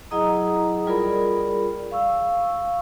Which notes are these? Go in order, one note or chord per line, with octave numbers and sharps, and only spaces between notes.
F#3 E4 G#4 D#5 A#5 D#6
G3 F4 G#4 A#4 D5 B5
F5 C#6 E6